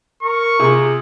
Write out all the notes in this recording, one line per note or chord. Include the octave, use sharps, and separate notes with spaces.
A#4 C#6
C3 F4 G#4